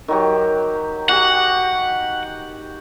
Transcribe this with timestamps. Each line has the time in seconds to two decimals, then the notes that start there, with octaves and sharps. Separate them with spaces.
0.08 D#3 F#3 G4
1.09 F#4 G4 F#5